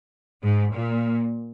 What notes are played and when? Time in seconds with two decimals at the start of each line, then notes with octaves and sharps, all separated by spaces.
0.42 G#2
0.73 A#2